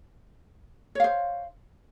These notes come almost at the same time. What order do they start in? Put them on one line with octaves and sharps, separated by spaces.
C#5 F5 C5